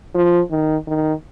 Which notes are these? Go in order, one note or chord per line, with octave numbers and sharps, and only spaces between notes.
F3
D#3
D#3